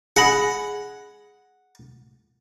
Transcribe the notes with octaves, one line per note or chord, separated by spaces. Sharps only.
G#4 F#5 B5 A#6 C#7